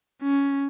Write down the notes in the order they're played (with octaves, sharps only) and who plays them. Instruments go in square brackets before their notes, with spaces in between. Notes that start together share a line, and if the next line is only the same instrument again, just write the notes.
[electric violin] C#4